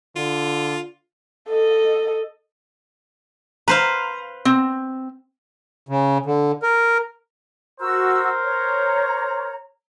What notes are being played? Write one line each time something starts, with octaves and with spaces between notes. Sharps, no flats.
D3 F4
A4 D#5
B4 C5 F5 A#5
C4
C#3
D3
A#4
F#4 A#4 C5 E6
C#5 A#5